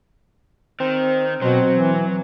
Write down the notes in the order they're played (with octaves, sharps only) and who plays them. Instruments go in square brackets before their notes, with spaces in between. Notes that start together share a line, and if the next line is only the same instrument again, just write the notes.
[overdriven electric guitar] D#3 [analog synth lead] C4
[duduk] B2 [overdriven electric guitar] F#3 [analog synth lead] C4
[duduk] E3